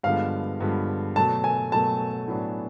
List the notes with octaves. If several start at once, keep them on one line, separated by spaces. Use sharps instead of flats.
G2 D3 F3 G#3 B3 F5
G2 D3 F3 G#3 B3
B2 F#3 A3 A5
G#5
B2 F#3 A3 A5
A2 F#3 B3 D4